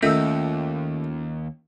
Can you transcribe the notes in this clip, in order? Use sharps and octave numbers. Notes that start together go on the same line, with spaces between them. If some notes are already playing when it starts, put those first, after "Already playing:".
D#2 D#3 A3 A#3 C#4 F4 A4 E6